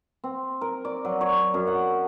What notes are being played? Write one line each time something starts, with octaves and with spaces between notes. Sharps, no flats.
C4
A#4
D5
F#3
C#5
F#2
F#5